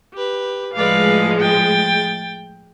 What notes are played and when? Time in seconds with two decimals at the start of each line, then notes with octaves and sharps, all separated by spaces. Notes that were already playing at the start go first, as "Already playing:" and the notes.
0.14 G4 B4
0.73 A2 F3 G#3 B4 D5 F5
1.39 G5 A6